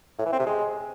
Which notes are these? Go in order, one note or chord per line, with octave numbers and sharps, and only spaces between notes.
A2
E3
C4
C3
G#3